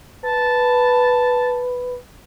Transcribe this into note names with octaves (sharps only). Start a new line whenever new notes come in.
B4 A5